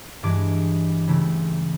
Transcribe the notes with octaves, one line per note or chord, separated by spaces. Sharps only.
G2 E3 G#3 D6
C#3 E3 A3 C4